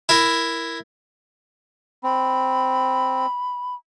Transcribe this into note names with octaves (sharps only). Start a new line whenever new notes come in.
E4 A#4
C4 B5